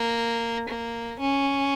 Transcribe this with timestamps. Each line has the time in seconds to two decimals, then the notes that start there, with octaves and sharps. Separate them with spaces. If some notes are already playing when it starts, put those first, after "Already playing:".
Already playing: A#3
0.69 A#3
1.20 C#4